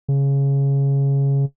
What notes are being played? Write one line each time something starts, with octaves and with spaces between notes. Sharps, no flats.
C#3